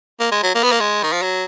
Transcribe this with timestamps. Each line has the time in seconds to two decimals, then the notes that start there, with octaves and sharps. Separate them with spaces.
0.20 A#3
0.32 G#3
0.43 F#3
0.55 A#3
0.63 B3
0.72 A#3
0.80 G#3
1.03 D#3
1.13 F3
1.22 F#3